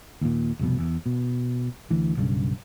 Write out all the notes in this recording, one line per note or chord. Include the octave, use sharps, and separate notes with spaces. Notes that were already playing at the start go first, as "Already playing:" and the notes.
D#2 A#2
F1 C2 F2 B2
E2
B2
D2 E3
B1 G2 C#3